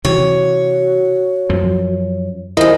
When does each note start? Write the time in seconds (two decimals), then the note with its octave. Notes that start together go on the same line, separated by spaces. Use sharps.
0.05 C3 E3 F#4 C#5
1.49 F#2 F3
2.57 F3 G#3 E4 A#4 D#5